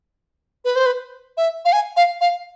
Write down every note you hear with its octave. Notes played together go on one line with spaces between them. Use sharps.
B4
C5
B4
E5
F5
G#5
F5
F5